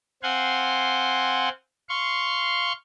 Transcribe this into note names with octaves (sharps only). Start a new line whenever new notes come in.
C4 F5 F#5 G#5 C6
F5 C6 C#6